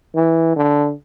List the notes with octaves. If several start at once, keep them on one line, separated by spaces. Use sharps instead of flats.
E3
D3